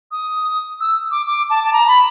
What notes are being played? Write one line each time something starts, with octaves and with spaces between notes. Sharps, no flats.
D#6
E6
D6
D6
A5
A5
A#5
B5